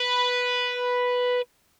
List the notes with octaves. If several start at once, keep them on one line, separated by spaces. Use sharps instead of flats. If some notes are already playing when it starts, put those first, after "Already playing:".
Already playing: B4